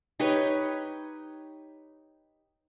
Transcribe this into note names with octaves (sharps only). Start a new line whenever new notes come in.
D#4 G4 B4 C#5